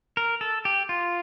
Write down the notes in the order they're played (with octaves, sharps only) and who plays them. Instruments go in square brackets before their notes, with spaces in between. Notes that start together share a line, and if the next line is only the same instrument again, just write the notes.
[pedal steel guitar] A#4
A4
G4
F4